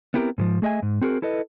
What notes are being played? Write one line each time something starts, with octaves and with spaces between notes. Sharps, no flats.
B3 C4 E4 G4 A#4
G#2 E3 F3
A3 G#4 D#5 E5 G#5
G#2
C4 F#4 G#4 A#4
E4 A4 B4 D#5